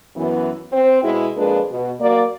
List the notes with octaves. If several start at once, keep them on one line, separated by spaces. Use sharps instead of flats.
F#2 E3 B3
C4 C5
B2 G#3 E4
F2 A#2 G#3 D4 G#4 B4
B2
F#3 A#3 D5